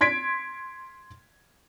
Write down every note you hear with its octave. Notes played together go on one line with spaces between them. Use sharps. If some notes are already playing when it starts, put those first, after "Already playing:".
C6 G#6 B6 D7